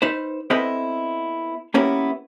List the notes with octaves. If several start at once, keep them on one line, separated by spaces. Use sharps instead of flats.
D#4 B4 C5
B3 C4 E4 A4 B4 D#5
A#3 B3 C#4 E4 G4 A#4